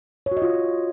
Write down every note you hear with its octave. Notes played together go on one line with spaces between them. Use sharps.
C#5
F#4
D#5
F4